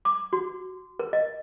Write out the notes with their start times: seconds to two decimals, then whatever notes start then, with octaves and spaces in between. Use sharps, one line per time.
0.05 D6
0.33 F#4
0.99 A#4
1.13 D#5